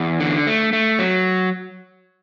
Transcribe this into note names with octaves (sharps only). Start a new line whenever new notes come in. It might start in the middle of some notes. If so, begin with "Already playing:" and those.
Already playing: E2
D3
A3
A3
F#3